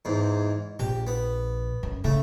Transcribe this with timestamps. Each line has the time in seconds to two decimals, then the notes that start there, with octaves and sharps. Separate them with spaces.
0.05 E2 G#2
0.79 A#1 G4
1.07 B3
1.83 F#2
2.04 C#3 A3